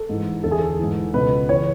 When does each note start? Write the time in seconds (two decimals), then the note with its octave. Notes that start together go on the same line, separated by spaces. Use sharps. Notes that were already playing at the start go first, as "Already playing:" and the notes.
Already playing: A4
0.09 G#2 E3
0.43 E2 D3 A4
0.51 G#4
0.59 A4
0.79 G#2 E3
1.14 C#2 B2 B4
1.49 C#3 E3 C#5